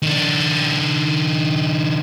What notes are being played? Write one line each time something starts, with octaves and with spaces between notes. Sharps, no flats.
D#3 D4